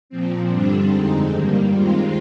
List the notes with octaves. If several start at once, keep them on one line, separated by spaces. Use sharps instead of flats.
A#2 F3 C4
G2 D3 G3 C4 D4
F2 D3 G#3 C4 D#4
G2 D#3 G3 A#3
D#2 D#3 G#3 C4 F4